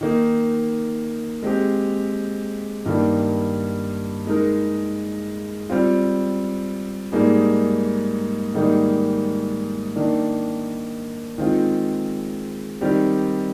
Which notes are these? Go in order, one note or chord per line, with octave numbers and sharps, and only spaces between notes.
D#3 A#3 D#4
G#3 C4 G4
G2 D#3 G3 A#3
G#3 D#4 A#4
G3 C4 F4
G#2 G3 A#3 D#4 G#4
G#2 D#3 G3 A#3 D#4
D#3 A#3 D4
D#3 G#3 C4 F4
D#3 G3 C4 G4 D5